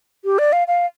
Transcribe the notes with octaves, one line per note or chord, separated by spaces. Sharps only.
G4
D5
F5
F5